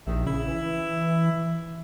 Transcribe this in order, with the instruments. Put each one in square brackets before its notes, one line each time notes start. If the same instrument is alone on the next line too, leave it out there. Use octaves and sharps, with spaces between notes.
[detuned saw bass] A#1 [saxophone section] C3 D#3 E4
[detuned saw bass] C#3 [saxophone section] E4
[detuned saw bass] E3